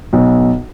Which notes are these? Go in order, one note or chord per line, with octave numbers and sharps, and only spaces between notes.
B1